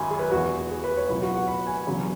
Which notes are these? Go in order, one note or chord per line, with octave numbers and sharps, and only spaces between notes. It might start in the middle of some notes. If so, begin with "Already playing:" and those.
Already playing: G#1 F#2 F#3 G#5 B5
G#4
B4
E1 E2 E3 F#4
G#4
B4
C#5
C#2 B2 F#3 E4
F#4
F#5
B5
G#5
E1 E2 C#3 F#3